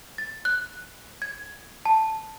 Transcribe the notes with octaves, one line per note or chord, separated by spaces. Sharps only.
A6
F#6
G#6
A5